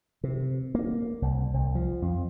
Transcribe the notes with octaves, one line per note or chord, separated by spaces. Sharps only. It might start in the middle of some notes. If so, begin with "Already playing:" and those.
C3
A#3
C2
C2
F3
F2